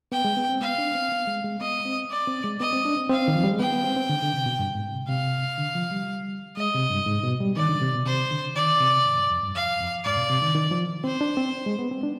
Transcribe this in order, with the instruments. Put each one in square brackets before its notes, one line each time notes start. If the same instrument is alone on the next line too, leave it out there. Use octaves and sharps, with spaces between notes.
[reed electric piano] B3 [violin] G5
[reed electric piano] G#3
B3
C4
[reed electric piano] B3 [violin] F5
[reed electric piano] D4
C4
B3
G#3
G#3
[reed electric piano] B3 [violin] D#5
[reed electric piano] C4
[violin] D5
[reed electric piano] C4
G#3
[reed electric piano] B3 [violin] D#5
[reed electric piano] C4
D4
C4
[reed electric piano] C4 [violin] F5
[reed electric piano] D#3
F3
G3
G#3
[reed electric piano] B3 [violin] G5
[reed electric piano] B3
C4
C4
D3
D3
C3
B2
G2
G#2
C3
[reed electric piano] C3 [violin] F5
[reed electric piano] D3
F3
G3
[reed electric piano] G#3 [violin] D#5
[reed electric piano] C3
G2
G#2
B2
G3
[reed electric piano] D#3 [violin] D5
[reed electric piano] D3
C3
B2
[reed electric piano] C3 [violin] C5
[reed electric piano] D3
[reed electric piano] D#3 [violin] D5
[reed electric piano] C3
G#2
G2
F2
G2
[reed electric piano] F2 [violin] F5
[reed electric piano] F2
[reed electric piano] G#2 [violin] D5
[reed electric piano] B2
C3
D#3
D#3
F3
[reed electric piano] C4 [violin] C5
[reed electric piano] D4
C4
G#3
B3
C4
D4